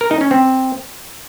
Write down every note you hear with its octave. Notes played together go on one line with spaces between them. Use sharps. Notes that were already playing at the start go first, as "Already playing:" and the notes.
A#4
D#4
C#4
C4